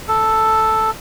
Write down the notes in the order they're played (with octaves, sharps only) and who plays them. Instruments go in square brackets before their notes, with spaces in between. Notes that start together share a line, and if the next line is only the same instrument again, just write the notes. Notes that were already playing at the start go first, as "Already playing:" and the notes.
[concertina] A4